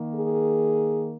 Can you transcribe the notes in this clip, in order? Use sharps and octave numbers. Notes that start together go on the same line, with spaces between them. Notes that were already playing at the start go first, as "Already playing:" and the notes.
Already playing: D#3 A#3
G#4